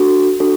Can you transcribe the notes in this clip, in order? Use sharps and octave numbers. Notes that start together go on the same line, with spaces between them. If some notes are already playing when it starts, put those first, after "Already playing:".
Already playing: D4 F#4 A4
D4 F#4 A4